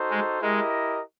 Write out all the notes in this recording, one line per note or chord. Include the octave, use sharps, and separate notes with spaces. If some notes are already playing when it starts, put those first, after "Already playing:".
Already playing: D#4 F#4 A4 C5
G#3
G#3 E4 G4 A#4 D#5